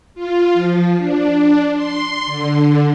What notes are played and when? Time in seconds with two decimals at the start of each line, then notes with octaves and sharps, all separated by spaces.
0.15 F4
0.54 F3
0.98 D4
1.35 D4
1.75 C6
2.26 D3